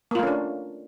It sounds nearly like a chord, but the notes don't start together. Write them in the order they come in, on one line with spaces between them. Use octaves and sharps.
A#3 F4 A3 C#4 D4